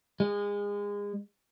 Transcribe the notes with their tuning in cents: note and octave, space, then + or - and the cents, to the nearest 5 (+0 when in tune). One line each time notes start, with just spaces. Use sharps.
G#3 -30